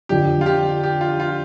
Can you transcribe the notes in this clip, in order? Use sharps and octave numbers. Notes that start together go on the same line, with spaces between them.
F2 D3 F3 G4
F4
G4
G4
F4
F4